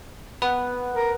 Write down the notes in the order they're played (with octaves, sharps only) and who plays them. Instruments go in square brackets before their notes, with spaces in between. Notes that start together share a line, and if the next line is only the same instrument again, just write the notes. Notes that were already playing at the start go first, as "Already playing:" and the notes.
[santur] B3 [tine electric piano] B4
[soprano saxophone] A#4